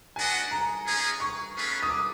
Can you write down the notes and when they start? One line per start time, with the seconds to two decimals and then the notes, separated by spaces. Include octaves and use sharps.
0.16 D4 F#4 B4 D#5 F#5 G#5
0.51 A#5
0.85 G#3 C#4 F4 G#4
1.20 C#6
1.55 A3 C#4 F4 G#4 B4
1.83 D#6
1.90 D6